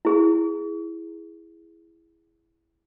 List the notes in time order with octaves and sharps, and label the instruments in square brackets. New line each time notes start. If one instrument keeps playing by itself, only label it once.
[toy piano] E4 G#4